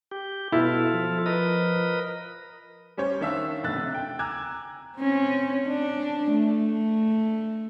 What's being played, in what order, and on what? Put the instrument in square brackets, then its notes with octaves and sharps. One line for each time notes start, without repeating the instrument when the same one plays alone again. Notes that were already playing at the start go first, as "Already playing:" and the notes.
[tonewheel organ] G4
[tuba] B2 [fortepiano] E4 [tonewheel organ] F4 A4
[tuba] F3
[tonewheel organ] A#4 B4 D#5
[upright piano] G3 C#4 C5 C#5
D#3 D4 E5 F5 E6
F1 B1 F#6 A6
C3
G5
G#5 A#5 D6 E6 F#6 G#6
[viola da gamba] C4 C#4
D4
A3